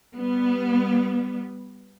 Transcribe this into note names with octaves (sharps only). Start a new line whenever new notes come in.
G3 B3